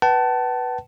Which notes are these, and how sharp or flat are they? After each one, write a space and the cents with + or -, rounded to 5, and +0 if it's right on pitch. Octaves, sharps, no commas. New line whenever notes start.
B4 -5 F#5 +45 A5 +0